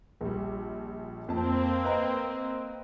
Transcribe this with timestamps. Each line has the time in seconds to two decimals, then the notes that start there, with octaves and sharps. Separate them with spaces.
0.21 A#1 G3
1.29 F2 A#3 C4 A5
1.83 B4 D#5 A#5